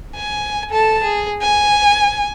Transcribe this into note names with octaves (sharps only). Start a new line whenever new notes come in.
G#5
A4 A5
G#4
G#5